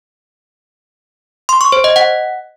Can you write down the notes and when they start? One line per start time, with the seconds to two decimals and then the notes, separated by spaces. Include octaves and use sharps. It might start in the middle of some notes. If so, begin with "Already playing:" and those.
1.49 C6
1.61 C#6
1.72 C5
1.84 D#5
1.96 F#5